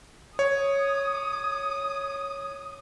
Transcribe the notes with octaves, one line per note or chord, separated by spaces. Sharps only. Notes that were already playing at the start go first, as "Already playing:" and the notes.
C#5 D#6